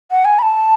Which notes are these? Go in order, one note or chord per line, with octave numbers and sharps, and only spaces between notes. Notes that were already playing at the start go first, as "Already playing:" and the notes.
F#5
G#5
B5
A5